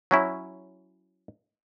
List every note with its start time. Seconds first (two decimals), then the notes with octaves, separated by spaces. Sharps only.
0.11 F#3 C#4 E4